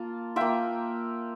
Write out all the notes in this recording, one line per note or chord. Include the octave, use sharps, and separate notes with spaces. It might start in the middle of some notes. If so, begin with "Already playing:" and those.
Already playing: A#3 F4 A5
A#3 F4 E5 G5